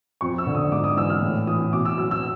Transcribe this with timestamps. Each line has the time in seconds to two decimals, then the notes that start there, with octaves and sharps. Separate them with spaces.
0.21 F2 C#6
0.38 E6
0.47 D3
0.55 D#6
0.72 G#2 D6
0.84 D#6
0.97 E3 E6
1.10 F6
1.22 A2
1.47 E3 D#6
1.73 B2 D6
1.85 E6
1.98 F#3 E6
2.11 E6